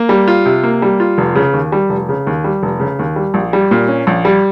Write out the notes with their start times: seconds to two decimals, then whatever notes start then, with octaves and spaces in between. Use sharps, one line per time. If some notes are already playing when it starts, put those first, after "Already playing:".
Already playing: A#3
0.09 G3
0.28 F4
0.46 C3
0.64 A#3
0.82 G3
1.00 F4
1.18 F1
1.35 C#3
1.53 D#2
1.72 G3
1.90 F1
2.09 C#3
2.27 D#2
2.44 G3
2.63 F1
2.80 C#3
2.99 D#2
3.16 G3
3.34 A#1
3.53 G3
3.71 A#2
3.88 C#4
4.07 A#1
4.25 G3